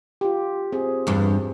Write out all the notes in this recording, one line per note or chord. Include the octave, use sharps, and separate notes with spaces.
F4 G4
C4 G#4
E2 G2